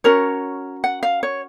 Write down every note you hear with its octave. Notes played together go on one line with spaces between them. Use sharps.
C#4 F#4 A#4 C#5
F#5
F5
C#5